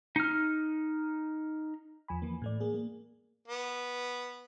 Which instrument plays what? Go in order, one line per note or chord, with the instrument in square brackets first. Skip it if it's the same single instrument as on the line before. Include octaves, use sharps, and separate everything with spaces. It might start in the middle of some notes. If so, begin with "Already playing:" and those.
[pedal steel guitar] D#4 F6
[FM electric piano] E2 F3 G#5 B5
E3 A#3
A2 A3 D5
A#3 G#4
A#3
[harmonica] B3